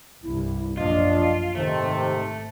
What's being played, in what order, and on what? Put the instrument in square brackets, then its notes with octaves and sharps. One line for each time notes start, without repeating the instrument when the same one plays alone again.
[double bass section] C2 G2 C3 [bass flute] E4
[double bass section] A#1 F#2 [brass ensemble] F3 D4 [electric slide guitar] F4 [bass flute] D#5
[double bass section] G#1 [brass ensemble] C3 [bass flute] D#3 [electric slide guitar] A3